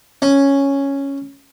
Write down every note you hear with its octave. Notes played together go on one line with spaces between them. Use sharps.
C#4